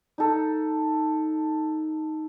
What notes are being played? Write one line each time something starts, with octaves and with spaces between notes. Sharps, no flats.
D#4 A4